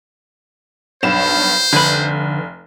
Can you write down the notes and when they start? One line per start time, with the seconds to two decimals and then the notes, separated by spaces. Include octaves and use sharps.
1.03 B1 G2 C5 E7
1.73 F1 D3 B4